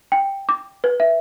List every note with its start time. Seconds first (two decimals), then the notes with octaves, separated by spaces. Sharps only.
0.12 G5
0.49 D6
0.84 B4
1.00 E5